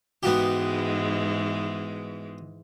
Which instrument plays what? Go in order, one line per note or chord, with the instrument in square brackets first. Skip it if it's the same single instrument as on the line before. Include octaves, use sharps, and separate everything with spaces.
[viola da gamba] G#2 E3 G#3 [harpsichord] B3 F#4 G4